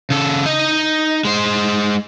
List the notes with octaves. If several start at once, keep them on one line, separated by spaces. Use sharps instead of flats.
C#3 A4
D#4 D#5
G#3 C5